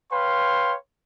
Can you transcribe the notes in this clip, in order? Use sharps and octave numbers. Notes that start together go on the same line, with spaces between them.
B4 C#5 F5 G5 C6